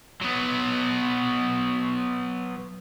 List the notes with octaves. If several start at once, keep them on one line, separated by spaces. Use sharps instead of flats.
F#3 B3